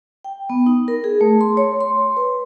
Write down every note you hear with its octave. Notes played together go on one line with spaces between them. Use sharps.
G5
B3
D#4
A#4
G#4
A3
C6
C#5
C6
B4